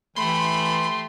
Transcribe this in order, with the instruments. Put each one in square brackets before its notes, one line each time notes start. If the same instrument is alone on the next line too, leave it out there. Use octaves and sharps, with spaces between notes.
[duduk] E3 [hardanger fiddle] A3 G4 [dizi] B5 [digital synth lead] C6